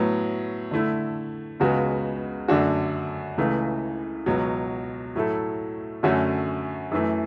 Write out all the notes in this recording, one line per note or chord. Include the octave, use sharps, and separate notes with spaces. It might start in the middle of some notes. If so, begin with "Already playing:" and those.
Already playing: A2 F#3 B3
D3 A3 E4
C#2 C#3 G#3 B3 F#4
F#2 D3 A3 D4 F#4
C#2 C#3 E3 A3
C#2 B2 F#3
A2 F#3 A3 E4 A4
F#2 D3 A3 C#4 F#4
F#2 E3 A3